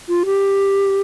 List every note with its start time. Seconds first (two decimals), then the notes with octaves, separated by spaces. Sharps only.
0.09 F4
0.26 G4